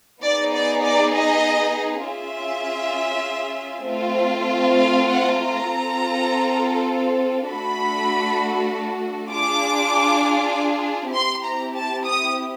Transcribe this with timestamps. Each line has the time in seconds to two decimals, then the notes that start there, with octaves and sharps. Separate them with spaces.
0.22 B3 D#4 G#4 D5
0.53 D5
0.83 D5
1.14 D#5
2.05 C#4 F4 G#4 E5
3.87 A3 C4 F4
4.77 F5
5.08 F#5
5.38 A#5
5.68 C4 F4 A4
7.50 A3 D4 F#4 A4 B5
9.31 D4 F4 G#4 D6
11.14 C4 E4 G4 C6
11.44 A#5
11.74 A5
12.05 D#6